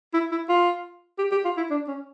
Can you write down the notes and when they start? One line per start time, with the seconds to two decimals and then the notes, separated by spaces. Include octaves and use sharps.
0.14 E4
0.31 E4
0.49 F4
1.18 G4
1.31 G4
1.45 F4
1.57 E4
1.71 D4
1.87 C#4